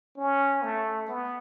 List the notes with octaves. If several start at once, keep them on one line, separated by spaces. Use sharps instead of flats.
C#4
A3
B3